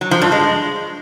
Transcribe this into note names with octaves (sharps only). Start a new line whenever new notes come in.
F#3
F3
G2
G#3